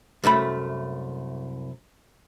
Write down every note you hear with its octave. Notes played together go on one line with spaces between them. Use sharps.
C2 F#2 A3 B5